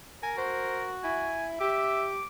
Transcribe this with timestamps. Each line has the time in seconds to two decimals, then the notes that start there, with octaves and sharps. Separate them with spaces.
0.23 A#4 G#5
0.37 F#4 C5
1.04 E4 G#5
1.60 G4 E5 D6